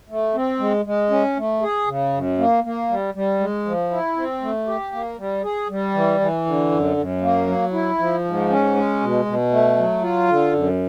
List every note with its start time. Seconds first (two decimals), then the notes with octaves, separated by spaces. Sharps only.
0.09 A3
0.35 C4
0.59 G#3
0.85 G#3
1.10 C#4
1.37 A3
1.62 G#4
1.87 C#3
2.13 F#2
2.38 A#3
2.64 A#3
2.89 G3
3.14 G3
3.40 G#3
3.66 F3
3.91 E4
4.16 C4
4.42 A3
4.67 G4
4.93 A#3
5.18 G3
5.44 G#4
5.69 G3
5.94 E3
6.20 E3
6.46 D3
6.71 F#2
6.97 F#2
7.21 A#3
7.47 F#3
7.72 E4
7.99 F3
8.25 G#2
8.50 C#4
8.76 G#3
9.01 B2
9.25 B2
9.51 A3
9.77 F#3
10.02 F4
10.28 D3
10.53 F#2